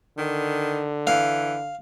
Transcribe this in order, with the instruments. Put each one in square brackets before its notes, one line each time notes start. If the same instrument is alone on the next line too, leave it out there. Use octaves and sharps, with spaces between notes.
[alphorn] D3 [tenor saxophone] D#3
[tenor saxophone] E3 [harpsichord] F5